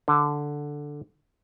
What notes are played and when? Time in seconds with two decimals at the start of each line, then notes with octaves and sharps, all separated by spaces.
0.08 D3